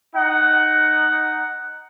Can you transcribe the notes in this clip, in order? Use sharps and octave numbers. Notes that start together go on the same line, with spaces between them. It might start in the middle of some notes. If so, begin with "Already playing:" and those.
D#4 F#5